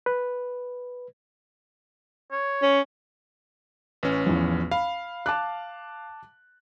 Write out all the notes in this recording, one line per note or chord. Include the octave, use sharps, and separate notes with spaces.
B4
C#5
C#4
A1 C#4 B4
E2 F3
F5 B5
A5 D6 F#6